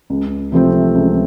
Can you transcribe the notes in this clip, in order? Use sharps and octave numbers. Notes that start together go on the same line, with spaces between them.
C#2
C3 F3 A3 C4
C#2